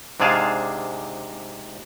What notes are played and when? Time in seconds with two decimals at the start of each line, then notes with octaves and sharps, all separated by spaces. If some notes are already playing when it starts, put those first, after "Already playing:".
0.20 G#2 C3 D4 G#4 F5 A5